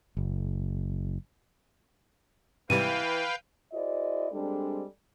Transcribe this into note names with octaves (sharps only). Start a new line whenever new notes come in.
F#1
G#2 C3 E3 G3 B4 F5 G5 D#7
E4 F#4 G#4 C5 D5 D#5
G3 G#3 C4 D4 G#4 A4